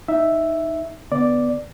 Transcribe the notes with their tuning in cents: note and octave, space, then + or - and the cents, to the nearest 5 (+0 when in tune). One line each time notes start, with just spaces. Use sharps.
D#4 +0 E5 +0
D3 +0 B3 +0 D5 +0